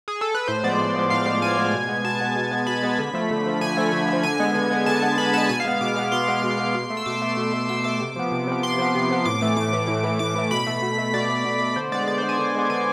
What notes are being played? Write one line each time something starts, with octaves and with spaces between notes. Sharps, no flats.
G#4
A4
B4
A2 C5
F3 G#3 B3 D5
A2
F3 G#3 B3
A2 F5
F3 G#3 B3 F5
A2 G#5
F3 G#3 B3
B2
G#3 B3
B2 A5
G#3 B3
B2
G#3 B3
B2 B5
G#3 B3
D3
F3 A3
D3
F3 A3
D3 G#5
F3 A3
D3
F3 A3
D3 G#5
G#3 B3
D3
G#3 B3
D3 A5
G#3 B3
D3 B5
G#3 B3 A5
B2 G#5
F5
G#3 B3
B2 D6
G#3 B3 D6
B2 C6
G#3 B3
B2
G#3 B3
B2
A3
E6
B2 D6
A3
B2
A3
B2 E6
A3 D6
C3
F3 B3
C3
F3 B3
C3 C6
F3 B3
C3
F3 B3
A2 D6
E3 A3 D6
A2 D6
E3 A3
A2
E3 A3
A2 D6
E3 A3
B2 B5
A3
B2
A3
B2 D5
A3
B2
A3
D3 C5
G#3 B3 D5
D3 D5
C5
G#3 B3
G#5
D3
G#3 B3
D3 G#5